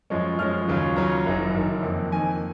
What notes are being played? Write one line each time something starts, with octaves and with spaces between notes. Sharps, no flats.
F#2 F3 G#3 C#4
F#2 F3 G#3 C#4 F6
D#2 C#3 F#3 C#4 F4
D#2 C#3 F#3 C#4 F4 A#5
F#1 F#2 D#3
F#1 F#2 D#3
F2 D#3 A#3
F2 D#3 A#3 G#5